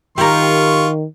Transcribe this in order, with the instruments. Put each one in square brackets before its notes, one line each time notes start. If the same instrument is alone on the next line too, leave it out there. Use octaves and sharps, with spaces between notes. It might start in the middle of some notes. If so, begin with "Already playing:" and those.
[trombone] D#3 [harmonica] F4 C#6 [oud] G4 A#4